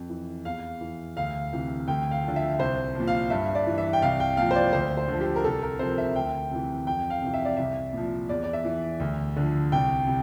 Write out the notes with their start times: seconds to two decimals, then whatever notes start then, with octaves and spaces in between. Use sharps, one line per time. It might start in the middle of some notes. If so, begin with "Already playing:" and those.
Already playing: F2
0.10 E3
0.45 E2 F5
0.81 E3
1.17 D2 F5
1.53 C3 E3
1.88 D2 G5
2.11 F5
2.23 D3 F3
2.36 E5
2.59 C2 C5
2.95 A#2 F3
3.08 F5
3.30 G2 E5
3.55 D5
3.67 E3
3.78 E5
3.93 G5
4.02 C2 F5
4.20 G5
4.37 A#2 F3 F5
4.51 C5
4.56 D5
4.73 D2 C5
4.97 C5
5.08 D3
5.13 F3
5.21 G4
5.36 A#4
5.44 C2 A4
5.63 A#4
5.79 C3 F3 C5
5.98 E5
6.16 D2 G5
6.51 C3 E3
6.87 F2 G5
7.10 F5
7.22 C3 E3
7.34 E5
7.45 D5
7.57 C2 E5
7.93 A#2 F3
8.29 E2 D5
8.44 D5
8.53 E5
8.65 E3
9.00 D2
9.36 D3 F3
9.72 C2 G5
10.07 C3